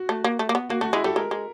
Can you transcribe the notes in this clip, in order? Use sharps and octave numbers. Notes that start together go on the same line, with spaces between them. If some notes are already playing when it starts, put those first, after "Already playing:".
Already playing: F#4
A3
A#3
A3
A#3
B3
A#3 F#4
A3 F#4
G#3 E4
G3 A4
G#3 A#4
G#3